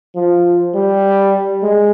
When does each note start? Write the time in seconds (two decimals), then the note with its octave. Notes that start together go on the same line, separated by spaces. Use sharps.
0.16 F3
0.74 G3
1.63 G#3